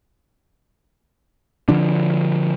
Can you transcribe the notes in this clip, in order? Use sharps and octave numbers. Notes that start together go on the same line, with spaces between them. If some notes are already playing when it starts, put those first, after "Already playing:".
D3 F3 D4